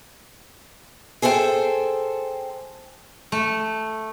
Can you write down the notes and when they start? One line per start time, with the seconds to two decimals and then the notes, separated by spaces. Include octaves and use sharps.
1.22 G#4 A4 C5 E5 G5
3.32 A3